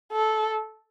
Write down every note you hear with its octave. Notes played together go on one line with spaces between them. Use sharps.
A4